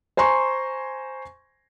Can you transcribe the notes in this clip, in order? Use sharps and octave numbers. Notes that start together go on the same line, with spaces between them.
C5 G#5 A#5 C6 C#6